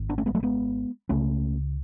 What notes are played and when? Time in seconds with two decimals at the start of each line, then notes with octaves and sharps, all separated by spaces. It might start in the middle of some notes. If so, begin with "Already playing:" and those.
Already playing: G#1
0.09 B3 D4
0.18 A3 C#4
0.26 G#3 B3
0.35 F#3 A3
0.43 G#3 B3
1.09 C#2 C#3 A3 C#4